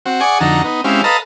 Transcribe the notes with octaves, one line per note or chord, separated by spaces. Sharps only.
C4 F#4
G#4 D5 F#5 G#5 C#6
F2 D3 D#4 F#4 A4 A#5
B3 D#4
G#3 C4 C#4 E4 G4 F5
A4 B4 D#5 F5 A5 A#5